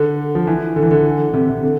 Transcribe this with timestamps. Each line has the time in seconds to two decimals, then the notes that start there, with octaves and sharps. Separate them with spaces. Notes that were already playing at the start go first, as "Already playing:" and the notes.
Already playing: D3
0.35 F3
0.47 E3
0.76 D3
0.83 E3
0.91 D3
1.29 D3
1.34 C3
1.49 C3
1.63 D3